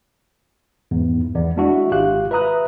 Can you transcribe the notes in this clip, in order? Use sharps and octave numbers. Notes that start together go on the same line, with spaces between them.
E2 G#2
E2 B3 D5
G#3 D4 E4 F#4 E5
G#1 F4 G4 F5 F#6
B4 E5 A#5 D#6 F#6